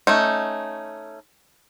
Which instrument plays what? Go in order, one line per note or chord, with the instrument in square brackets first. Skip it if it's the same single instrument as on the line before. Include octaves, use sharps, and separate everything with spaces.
[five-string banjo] A3 C#4 D#4